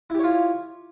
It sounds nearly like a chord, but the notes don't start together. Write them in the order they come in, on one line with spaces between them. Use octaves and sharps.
E4 G4 C#5 F4